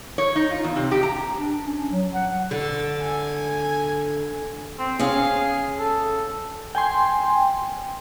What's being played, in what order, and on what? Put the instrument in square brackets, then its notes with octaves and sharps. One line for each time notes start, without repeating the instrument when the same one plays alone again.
[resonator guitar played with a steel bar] C#5
D#4
F4
E2
C3
G4
A#5
[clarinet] D4
C#4
F#3
F#5
[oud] D3 [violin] E6 A6
[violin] G#5
[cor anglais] C4
[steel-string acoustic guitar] C#4 F5 [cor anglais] G#4
[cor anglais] A4
[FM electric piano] G5 G#5 C6